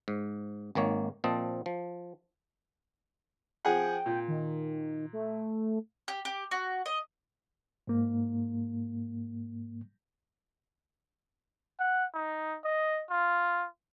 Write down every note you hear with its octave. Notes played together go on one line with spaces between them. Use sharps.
G#2
G#1 D#3 A#3 C#5
A#2 F3 C4 D#5 A5
F3
F3 G#4 F#5 G5
A#2
D#3
A3
G4
G4
F#4
D#5
G#2 A#3
F#5
D#4
D#5
F4